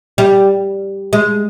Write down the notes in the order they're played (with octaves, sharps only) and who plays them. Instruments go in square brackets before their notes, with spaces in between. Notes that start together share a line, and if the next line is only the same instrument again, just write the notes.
[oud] G3
G#3